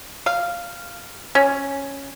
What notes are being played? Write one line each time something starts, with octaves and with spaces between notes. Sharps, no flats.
F5
C#4